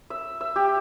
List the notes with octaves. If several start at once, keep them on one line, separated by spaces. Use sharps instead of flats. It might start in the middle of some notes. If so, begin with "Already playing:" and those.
E5
E5
G4